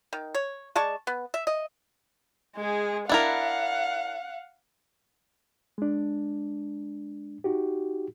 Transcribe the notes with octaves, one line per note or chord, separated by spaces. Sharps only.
D#3
C#5
G#3 D5 A5 C#6
B3
E5
D#5
G#3 G#4
D4 E4 A#4 F5 F#5
G#3 D4
D#4 F#4 G4